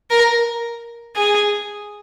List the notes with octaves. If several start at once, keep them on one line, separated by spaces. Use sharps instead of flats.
A#4
G#4